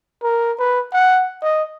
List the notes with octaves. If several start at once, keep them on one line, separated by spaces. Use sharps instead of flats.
A#4
B4
F#5
D#5